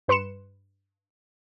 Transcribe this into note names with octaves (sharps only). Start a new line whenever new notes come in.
G2 B4 C6 C#7 E7